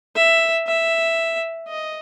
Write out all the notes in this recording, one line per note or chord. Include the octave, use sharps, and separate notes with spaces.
E5
E5
D#5